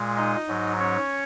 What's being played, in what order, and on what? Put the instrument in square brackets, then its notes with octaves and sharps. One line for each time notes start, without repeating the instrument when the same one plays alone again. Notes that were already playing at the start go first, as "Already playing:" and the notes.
Already playing: [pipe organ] A#2 G#3
D#4 D#5
G#2 F#3
C#4 C#5